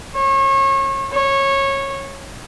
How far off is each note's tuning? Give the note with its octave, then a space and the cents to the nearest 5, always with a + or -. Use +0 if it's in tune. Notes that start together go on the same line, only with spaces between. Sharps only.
C#5 -35
C#5 -15